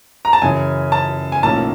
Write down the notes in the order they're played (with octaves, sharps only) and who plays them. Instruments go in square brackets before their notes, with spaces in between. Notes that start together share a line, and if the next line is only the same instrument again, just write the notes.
[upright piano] A#5
A5
[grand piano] F#2 C#3 E3 [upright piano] G#5
[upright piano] A5
G#5
[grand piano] B1 A2 F3 A#3 C#4 [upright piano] A5